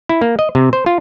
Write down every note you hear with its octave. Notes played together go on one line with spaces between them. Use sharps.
E4
A#3
D#5
C3
C5
F4